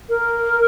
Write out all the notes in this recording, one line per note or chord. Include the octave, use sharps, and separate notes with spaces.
A#4